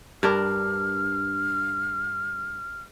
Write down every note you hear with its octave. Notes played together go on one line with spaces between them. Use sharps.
G2 D4 A#4 F6